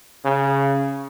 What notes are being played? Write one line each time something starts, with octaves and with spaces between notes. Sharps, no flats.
C#3